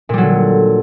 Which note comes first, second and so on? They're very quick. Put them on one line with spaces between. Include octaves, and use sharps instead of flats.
A#2 G3 F#3 D3